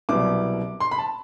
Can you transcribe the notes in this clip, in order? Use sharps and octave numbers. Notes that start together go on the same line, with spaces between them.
C2 B2 F#3 D6
C6
B5
A5